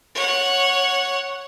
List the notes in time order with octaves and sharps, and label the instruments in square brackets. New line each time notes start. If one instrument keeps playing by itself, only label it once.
[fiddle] C#5 F#5